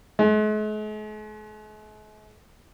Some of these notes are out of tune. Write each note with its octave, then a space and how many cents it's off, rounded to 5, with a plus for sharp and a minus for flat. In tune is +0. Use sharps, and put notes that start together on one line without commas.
G#3 +45